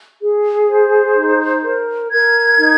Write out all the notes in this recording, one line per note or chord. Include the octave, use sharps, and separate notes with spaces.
G#4
C5
D#4
A#4
A#4 G#6
D#4